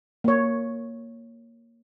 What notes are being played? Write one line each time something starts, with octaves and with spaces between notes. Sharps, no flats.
A#3 C#5